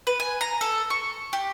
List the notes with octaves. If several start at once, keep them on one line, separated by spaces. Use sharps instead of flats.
B4
G#5
A#5
A4
C#6
G4